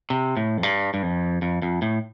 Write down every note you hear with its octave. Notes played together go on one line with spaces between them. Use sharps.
C3
A2
F2
G2
G2
F2
F2
F2
A2